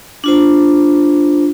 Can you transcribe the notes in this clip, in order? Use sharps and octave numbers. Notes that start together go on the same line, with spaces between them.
D4 F4 C5